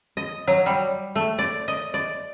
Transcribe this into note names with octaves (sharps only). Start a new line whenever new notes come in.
D#5
F#3
G3
A3
D5
D#5
D5